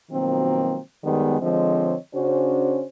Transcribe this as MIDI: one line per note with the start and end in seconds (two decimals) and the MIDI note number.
0.10 0.80 47
0.10 0.80 51
0.10 0.80 53
0.10 0.80 54
0.10 0.80 58
0.10 0.80 60
1.04 1.37 42
1.04 1.37 51
1.04 1.37 55
1.04 1.37 56
1.04 1.37 59
1.41 1.95 50
1.41 1.95 53
1.41 1.95 56
1.41 1.95 60
1.41 1.95 73
1.41 1.95 75
2.14 2.85 49
2.14 2.85 61
2.14 2.85 62
2.14 2.85 66
2.14 2.85 72